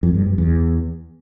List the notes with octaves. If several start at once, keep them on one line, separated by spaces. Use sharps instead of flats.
F2
G2
G2
E2